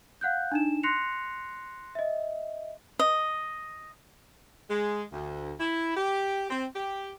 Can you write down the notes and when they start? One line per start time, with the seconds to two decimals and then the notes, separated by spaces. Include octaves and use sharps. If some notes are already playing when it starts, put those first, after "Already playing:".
0.21 F5 F#5 F#6 G6
0.52 D4 D#4 E7
0.83 C6 F#6 A#6 C7 C#7 F7
1.95 D#5 E5
2.99 D#5
4.70 G#3
5.13 D2
5.60 E4
5.97 G4
6.50 C4
6.76 G4